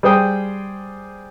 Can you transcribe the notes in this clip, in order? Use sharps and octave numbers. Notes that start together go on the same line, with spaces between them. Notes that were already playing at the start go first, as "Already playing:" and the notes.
G3 G#4 C5 G5 D#6